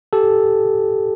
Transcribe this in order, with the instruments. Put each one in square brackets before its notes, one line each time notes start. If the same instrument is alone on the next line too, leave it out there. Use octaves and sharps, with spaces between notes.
[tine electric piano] G4 A4